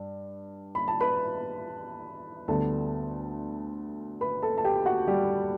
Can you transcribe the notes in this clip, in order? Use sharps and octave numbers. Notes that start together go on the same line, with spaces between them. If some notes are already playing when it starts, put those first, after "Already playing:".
Already playing: G2
B5
A5
B4 B5
D2 D3 G3 B3 A4 A5
B4 B5
A4 A5
A5
G4 G5
F#4 F#5
G3 G4